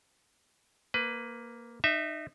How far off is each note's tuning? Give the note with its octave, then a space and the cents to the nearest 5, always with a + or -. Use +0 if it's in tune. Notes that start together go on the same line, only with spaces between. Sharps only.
A#3 +0 B4 +20
D#4 -30 E5 +0